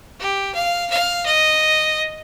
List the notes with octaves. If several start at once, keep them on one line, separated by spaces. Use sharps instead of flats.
G4
F5
F5
D#5